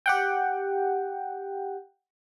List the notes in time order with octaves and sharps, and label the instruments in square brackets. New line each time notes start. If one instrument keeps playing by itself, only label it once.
[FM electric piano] G4 F#5 G5